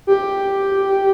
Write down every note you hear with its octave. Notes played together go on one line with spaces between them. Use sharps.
G4